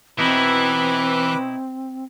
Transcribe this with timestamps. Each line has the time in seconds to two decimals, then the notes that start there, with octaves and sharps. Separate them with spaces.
0.19 B2 E3 C4 D#4 E4 B4 D6